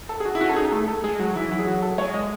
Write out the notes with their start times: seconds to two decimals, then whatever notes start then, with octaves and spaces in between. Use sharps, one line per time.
0.09 A4
0.20 G#4
0.25 F#4
0.35 E4
0.40 C#4 F#4
0.49 A4
0.56 D#4 G#4
0.72 A3 A4
0.88 A4
1.04 G#3 G#4
1.19 F#3 F#4
1.35 E3 E4
1.51 F#3 E4
1.59 G#4
1.67 F#4
1.82 A4
1.98 G#3 C#5
2.14 D#5